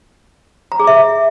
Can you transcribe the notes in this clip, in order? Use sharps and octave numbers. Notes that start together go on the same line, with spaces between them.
A#5
G#4
E5